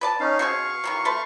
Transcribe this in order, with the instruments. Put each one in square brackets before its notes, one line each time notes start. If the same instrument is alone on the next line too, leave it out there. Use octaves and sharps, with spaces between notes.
[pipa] B4 D5 A5
[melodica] C#4 D#4 F5
[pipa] B2 C4 G#4 [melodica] F5 C#6
[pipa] D#3 E3 F#3
A3 B4 C6